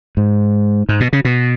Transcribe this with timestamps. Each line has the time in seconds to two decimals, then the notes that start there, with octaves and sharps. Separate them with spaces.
0.17 G#2
0.89 G#2
1.00 B2
1.13 C#3
1.25 B2